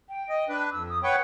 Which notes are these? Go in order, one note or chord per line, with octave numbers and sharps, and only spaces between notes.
G5
D#5
D4 B4
F2 E6
D#6
B4 C#5 F#5 G5